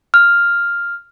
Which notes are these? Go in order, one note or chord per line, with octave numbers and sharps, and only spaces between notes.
F6